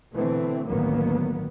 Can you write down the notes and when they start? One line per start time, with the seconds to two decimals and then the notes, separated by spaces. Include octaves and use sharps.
0.12 B2 D3 E3 A3 C4
0.66 A1 D2 D#3 F#3 A#3 B3